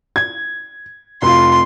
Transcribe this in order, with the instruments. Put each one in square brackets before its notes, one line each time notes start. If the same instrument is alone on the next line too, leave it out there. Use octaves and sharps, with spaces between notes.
[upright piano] G#6
[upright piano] F1 F4 [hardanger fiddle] C6